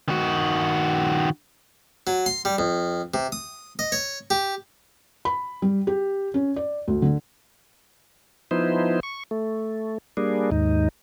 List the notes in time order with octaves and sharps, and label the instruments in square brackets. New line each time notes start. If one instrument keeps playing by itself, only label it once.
[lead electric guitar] D#3 F#4
[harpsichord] F#3
C6
G3
F2
C3
D#6
D#5
C#5
G4
[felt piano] B5
G3
G4
C#4
D5
D2
D3
[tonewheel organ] F3 B3 D#4 E4 C5
C#6
A3
G3 A#3 D4 G#4
D#2 G#2 D#4